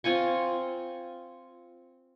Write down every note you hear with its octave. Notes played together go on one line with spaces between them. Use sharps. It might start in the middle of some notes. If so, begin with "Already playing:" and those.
C4 F4 G#5 C#6